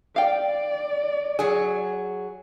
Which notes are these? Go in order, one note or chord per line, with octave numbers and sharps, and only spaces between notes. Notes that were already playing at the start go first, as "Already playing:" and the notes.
D5 F5 G5
F#3 G#4